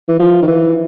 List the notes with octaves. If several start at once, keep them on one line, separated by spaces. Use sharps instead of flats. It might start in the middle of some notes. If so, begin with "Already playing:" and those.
E3
F3
D#3
E3